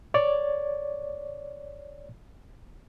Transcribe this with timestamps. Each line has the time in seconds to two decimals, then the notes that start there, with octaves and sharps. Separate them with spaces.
0.14 C#5 D5